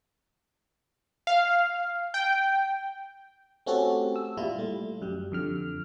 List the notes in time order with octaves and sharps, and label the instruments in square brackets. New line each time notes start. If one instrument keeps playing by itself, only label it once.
[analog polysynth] F5
G5
[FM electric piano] A3 C4 C#4 F#4 G4 A4
E6
A#2 G3 E4 F4
G3 A3
F#2 G3
F2 D3 F6